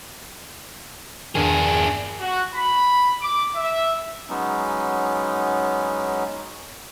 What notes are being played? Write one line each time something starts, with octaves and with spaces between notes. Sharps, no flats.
E2 G2 D#3 D4 G#4
F#4
B5
D6
E5
F#3 G#3 B3 C#4 D#4